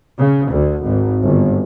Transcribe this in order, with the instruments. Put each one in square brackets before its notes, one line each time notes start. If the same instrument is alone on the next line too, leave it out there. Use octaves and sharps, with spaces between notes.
[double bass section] C#3
D2
G#1
G1